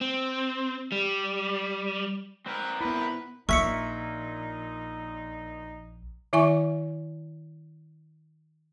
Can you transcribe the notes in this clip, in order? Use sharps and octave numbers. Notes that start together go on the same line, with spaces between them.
C4
G3
C4 A#4 B4
B3 E4 B4 B5
A#1 A#2 D#4 E5 C#6 E6 B6 C#7
D#3 E4 E5 G#5 C#6 D6